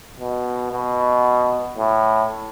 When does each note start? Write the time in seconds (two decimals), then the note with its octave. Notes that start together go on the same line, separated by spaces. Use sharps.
0.20 B2
0.72 B2
1.77 A2